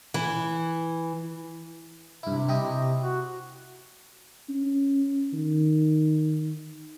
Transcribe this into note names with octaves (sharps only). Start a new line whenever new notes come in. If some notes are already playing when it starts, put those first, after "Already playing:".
E3
G2 C3 E4
E4 G4 D#5
C3
F#4
C#4
D#3